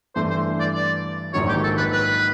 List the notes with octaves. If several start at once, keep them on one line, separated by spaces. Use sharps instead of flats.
G2 E3 A3 C5
C5
D5
D5
A#1 G#2 D#3 F#3 C#5
G4
A4
B4
B4